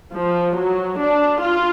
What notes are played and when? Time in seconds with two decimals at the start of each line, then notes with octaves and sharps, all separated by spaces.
0.13 F3
0.56 F#3
0.99 D4
1.42 F4